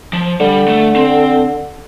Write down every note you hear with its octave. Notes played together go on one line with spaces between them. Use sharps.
F3
D3 G3
A3
C4